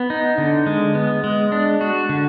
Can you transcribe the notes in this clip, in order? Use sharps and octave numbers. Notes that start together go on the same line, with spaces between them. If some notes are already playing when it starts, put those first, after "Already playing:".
Already playing: B3
D#4
D3
G#3
B3
G#3
D4
F#4
D3